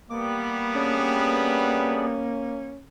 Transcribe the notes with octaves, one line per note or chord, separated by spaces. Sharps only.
G3 A#3 B3 D6
C#4 D4 G#4 D5